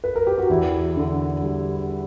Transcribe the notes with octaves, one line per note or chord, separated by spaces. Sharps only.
B4
A#4
G4
F#4
E2 E4
D3
G3